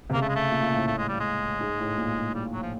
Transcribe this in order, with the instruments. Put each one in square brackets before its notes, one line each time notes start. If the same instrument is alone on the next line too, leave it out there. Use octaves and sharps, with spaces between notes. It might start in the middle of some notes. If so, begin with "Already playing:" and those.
[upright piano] C3
[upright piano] C#3 [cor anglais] A#3
[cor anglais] A3
G#3
A3
[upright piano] A#2
A#2
A2
[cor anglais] A3
G#3
G3
G#3
[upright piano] G#2
A2
A#2
[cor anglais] G3
F#3
F3